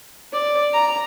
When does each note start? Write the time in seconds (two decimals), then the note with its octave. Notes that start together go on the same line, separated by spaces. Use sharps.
0.33 D5
0.74 A#5